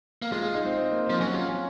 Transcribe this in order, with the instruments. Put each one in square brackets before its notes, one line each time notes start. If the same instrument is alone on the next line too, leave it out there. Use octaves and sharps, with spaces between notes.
[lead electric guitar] A#3
[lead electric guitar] G#3 [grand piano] F4
[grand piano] F4
D#4
C4
C4
A#3
C4
[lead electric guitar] F3
[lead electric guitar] F#3 [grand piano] C#4
[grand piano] F4
C#4